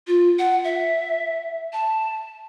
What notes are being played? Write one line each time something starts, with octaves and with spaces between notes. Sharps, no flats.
F4
F#5
E5
A5